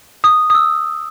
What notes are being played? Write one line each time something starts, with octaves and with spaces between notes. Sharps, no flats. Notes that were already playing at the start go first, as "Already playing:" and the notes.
D#6
D#6
E6